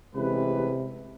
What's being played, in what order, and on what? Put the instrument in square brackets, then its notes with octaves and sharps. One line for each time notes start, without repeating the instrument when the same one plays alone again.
[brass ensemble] A1 G#3 B4 [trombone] C3